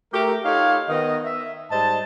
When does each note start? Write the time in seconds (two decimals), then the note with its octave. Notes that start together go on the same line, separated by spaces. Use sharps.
0.13 A3 G4 A#4
0.45 D#4 F4 G4 A4 C#5 F5
0.89 D#3 B3 D#5
1.25 E5
1.72 G#2 G3 C5 D#5 A5